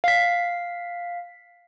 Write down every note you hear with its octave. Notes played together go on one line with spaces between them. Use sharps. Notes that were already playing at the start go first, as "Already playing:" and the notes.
F5 B6